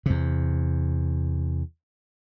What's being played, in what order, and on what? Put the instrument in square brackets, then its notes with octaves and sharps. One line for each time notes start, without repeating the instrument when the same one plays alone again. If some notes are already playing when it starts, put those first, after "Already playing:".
[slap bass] E2 C3